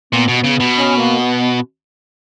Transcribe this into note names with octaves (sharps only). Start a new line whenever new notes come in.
A#2 B3
B2
C#3
B2
C#4
A#3
B3